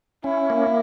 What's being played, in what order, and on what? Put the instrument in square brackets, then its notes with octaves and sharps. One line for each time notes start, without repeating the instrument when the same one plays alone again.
[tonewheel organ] C#4 [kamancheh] E4
[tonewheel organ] A#3